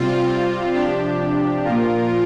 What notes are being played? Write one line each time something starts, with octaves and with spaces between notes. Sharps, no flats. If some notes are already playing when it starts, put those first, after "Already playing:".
Already playing: C3 G3 C4 F4
C3 F3 D4 G4
A#2 F3 F4 A#4